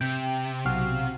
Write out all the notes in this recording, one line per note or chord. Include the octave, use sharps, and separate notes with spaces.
C3 G5
B1 F#4 F5